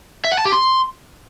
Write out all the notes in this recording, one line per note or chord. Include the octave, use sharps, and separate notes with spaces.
E5
F#5
A5
G4
C6